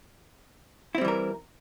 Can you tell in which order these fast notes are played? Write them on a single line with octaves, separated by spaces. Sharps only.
E4 C4 G3 E3 A#4